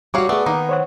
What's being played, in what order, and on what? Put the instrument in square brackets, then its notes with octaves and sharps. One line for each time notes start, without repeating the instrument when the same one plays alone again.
[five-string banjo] E3 C#5 F5 [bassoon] F#3 [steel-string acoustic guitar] G3 F#4 [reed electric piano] D6
[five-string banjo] A3 [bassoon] B3 [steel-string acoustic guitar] G#4 D5
[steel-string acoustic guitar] D#3 [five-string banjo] A#3 D#4
[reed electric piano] C5 C#5 F#5